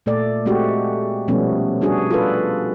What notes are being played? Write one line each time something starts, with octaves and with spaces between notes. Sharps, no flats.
A#2 A3 A4 D5
G#3 A3 C4 F#4 G4
B2 F3 G3 A3 B3 C#4
G3 D4 F#4 G#4
F4 A4 B4